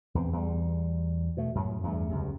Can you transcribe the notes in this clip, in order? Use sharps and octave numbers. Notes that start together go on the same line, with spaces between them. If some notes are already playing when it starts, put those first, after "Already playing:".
E2 B3 C4
E2 G3
B2 A3
F#2 A2 F#3
E2 G2 A3
C#2 F#2 C3